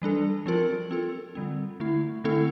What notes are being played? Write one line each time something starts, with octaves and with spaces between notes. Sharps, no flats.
E3 G3 D4 A4
F3 C4 F4 A#4
C4 F4 A4
D3 G3 C4
D3 A3 E4
D3 A3 C4 E4 A4